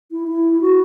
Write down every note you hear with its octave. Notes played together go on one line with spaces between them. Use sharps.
E4
E4
F#4